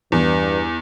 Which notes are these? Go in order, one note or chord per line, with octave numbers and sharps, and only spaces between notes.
E2 G2